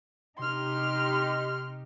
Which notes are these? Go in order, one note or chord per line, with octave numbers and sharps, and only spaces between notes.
C3 D#4 G4 C6 F6